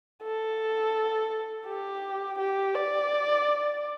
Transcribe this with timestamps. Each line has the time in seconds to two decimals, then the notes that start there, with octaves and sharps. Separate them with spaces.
0.23 A4
1.66 G4
2.39 G4
2.75 D5